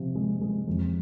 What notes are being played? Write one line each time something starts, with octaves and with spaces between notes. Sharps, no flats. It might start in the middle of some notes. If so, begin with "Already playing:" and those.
Already playing: C3 F3
G#3
G#3
F2